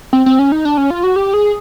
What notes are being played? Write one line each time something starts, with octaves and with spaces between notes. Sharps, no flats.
C4
C4
C#4
D#4
D4
C#4
F4
F#4
G4
G#4